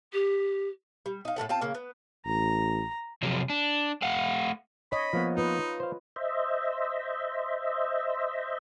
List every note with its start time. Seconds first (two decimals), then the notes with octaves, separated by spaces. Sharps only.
0.12 G4
1.06 G3
1.25 D#4 F5
1.36 A2 G3 A4 F#5
1.49 C4 F4 G5 A5
1.61 C#3 A#3
1.75 B3
2.26 A1 A#5
3.23 C3 F3 F#3 C4 G#4
3.50 D4
4.02 A3 F5 F#5
4.92 C#5 D#5 B5
5.13 F3 A#3 B3
5.37 D#4 F4 B4
5.80 C5 F5
6.16 C5 D#5 E5